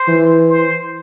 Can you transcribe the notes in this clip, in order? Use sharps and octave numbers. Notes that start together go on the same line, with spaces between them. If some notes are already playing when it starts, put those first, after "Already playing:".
Already playing: C5
E3
C5